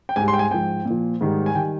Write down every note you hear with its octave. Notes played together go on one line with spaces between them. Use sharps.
G5
G#2 G3 G#5
C6
G5
G#5
G#2 F3 G5
A#2
F3
G#2 D#3 G3
G#5
D#3 G3 G5